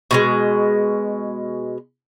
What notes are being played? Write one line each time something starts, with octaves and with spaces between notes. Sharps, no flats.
B2 E3 G#3